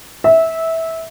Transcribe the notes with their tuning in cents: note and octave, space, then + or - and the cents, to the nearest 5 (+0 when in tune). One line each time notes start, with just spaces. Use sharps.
E5 -15